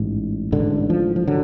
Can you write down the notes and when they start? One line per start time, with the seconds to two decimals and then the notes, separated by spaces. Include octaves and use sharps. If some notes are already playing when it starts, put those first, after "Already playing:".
Already playing: A1 G#2
0.52 A1 G#2 D3
0.90 F3
1.16 F3
1.27 D3 F#3